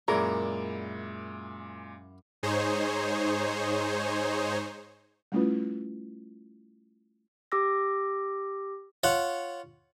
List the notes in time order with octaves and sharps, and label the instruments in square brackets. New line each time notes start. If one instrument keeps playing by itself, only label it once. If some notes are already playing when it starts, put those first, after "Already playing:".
[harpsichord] F#2 E4 [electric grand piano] A#2 G#3 D6 [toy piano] G#4 D5 [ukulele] A#4
[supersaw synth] G#2 D#4 G#4 C5 C#5
[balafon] G3 A3 C#4 E4 F4 B4
[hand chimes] G4 D6 E6 A#6
[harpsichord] F4 C#5 F#5